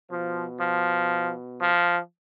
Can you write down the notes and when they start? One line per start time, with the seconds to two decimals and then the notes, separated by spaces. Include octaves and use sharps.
0.10 B2 F3
0.60 F3
1.61 F3